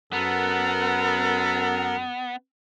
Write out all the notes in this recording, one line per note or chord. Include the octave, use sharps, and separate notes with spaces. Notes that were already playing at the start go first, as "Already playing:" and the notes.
F#2 B3 A4 A#4 F#5